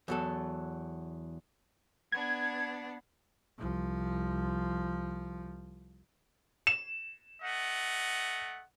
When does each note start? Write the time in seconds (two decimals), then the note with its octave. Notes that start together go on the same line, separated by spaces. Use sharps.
0.08 E2 F#3 A4
2.12 B3 D4 G#6
3.59 C2 F3
6.67 E7
7.42 A3 D#5 F#5